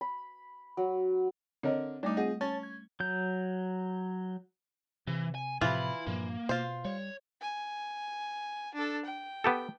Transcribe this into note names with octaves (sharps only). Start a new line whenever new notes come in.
B5
F#3
D3 C4 A#4 C#5 D#5
G3 A3 D4 D#4 D6
C4 F4 G#4 D#5 F#5
C#4 C#5 A5 A6
G#6
F#3 G6
C3 E3
G#5
A2 C3 E3 F3 E4 F4 B5
G2 A#2 F3 A#3
B2 F4 C5
G3 C#5
G#5
D4 A4
G5
B3 G4 A4